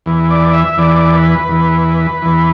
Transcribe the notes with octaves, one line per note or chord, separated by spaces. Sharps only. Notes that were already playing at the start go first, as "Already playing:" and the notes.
E2 E3
D5
E5
E2 E3 D5
B4
E2 E3
E2 E3